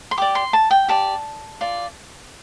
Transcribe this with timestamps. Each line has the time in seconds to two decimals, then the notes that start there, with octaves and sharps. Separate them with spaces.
0.11 C6
0.18 G4 D5 D6
0.35 C6
0.53 A5
0.71 G5
0.88 G4 D5 A5
1.61 F4 D5